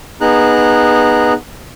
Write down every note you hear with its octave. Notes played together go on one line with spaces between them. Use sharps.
B3 D#4 G#4 A#5 F#6